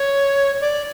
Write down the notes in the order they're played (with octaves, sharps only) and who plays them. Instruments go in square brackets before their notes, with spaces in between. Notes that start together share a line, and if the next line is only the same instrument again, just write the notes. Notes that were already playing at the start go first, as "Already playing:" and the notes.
Already playing: [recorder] C#5
D5